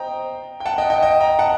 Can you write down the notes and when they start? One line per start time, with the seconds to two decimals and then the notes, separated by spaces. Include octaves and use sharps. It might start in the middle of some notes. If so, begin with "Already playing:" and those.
Already playing: C5 D#5 G5 A#5
0.60 G5
0.66 F#5 A5
0.78 D#5 G5
0.90 D#5 G5
1.02 D#5 G5
1.20 G5 A#5
1.39 F#5 A5